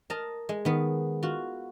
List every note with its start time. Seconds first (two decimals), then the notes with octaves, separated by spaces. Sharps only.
0.10 A#4 D#5 A5 A#5
0.49 G#3
0.65 D#3 B3
1.23 F4 F#4